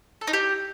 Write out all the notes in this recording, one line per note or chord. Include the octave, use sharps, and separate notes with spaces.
A4
D#4
G4